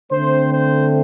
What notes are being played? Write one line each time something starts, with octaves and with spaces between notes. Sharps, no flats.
D3 A3 C4 C5
C5